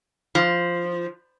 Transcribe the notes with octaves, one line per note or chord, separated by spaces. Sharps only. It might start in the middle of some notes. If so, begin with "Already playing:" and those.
F3